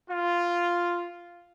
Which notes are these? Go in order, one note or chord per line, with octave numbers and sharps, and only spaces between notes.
F4